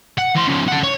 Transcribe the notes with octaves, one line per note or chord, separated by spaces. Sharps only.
F#5
E3 C6
C#3 F3
A4 F#5
C#5